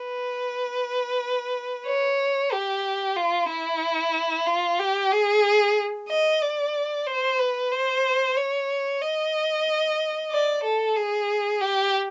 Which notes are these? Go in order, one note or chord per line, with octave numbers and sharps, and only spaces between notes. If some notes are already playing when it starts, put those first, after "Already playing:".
Already playing: B4
C#5
G4
F4
E4
F4
G4
G#4
D#5
D5
C5
B4
C5
C#5
D#5
D5
A4
G#4
G4